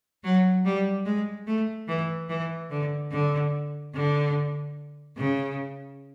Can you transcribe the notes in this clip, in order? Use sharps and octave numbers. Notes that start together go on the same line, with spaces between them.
F#3
G3
G#3
A3
E3
E3
D3
D3
D3
C#3